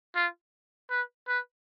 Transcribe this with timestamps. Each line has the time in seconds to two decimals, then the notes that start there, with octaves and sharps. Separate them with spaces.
0.15 F4
0.90 B4
1.28 B4